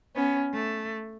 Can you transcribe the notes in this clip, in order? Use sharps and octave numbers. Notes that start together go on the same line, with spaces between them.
B3 C#4
A3